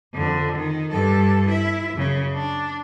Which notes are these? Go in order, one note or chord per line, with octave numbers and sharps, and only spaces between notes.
F2 D3
D#3
G2 A4
E4 E5
F#2 C#3
D4